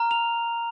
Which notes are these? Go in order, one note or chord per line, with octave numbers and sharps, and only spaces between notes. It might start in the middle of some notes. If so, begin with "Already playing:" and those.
Already playing: A#5 F6
F7